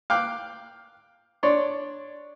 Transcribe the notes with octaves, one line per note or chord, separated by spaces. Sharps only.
F5 G5 D6 F#6
D4 C#5 D5 C6